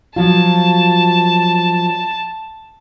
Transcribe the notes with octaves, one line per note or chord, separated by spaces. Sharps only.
F3 F#3 F4 A5